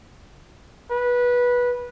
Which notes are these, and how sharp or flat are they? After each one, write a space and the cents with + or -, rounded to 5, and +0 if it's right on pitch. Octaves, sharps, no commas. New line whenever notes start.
B4 -15